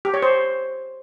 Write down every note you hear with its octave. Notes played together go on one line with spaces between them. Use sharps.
G4
C#5
C5